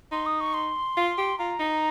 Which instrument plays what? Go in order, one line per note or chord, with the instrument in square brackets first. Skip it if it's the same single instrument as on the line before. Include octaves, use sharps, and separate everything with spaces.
[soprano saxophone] D#4 [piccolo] C6
[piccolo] D#6
C#6
C6
[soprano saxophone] F4
G4
[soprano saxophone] F4 [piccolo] A#5
[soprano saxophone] D#4